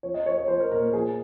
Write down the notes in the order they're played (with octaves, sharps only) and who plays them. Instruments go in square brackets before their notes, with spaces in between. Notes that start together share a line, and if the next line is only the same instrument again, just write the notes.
[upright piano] F3 C#5
D#5
F3 C#5
C#5
F3 C5
A#4
A#2 A#4
A#4
F3 G#4